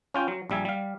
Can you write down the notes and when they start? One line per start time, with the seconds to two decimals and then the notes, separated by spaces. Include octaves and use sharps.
0.14 C#4 F4 G5
0.28 F#3
0.50 A#1 G3 E5 G#5
0.65 G3 F5